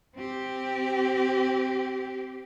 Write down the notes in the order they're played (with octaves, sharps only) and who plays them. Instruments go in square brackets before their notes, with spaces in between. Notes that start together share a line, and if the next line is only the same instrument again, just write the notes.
[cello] C4 G4